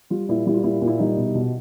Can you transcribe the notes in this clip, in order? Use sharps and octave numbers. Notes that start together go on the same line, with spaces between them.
G3 F4
A#2 E4
G3 E4
F4
A#2 E4
A#2
E4
G3 D#4
B2
B2